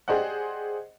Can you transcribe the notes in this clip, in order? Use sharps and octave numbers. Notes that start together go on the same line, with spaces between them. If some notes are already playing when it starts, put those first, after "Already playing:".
G4 G#4 C5 D5 D#5 F#5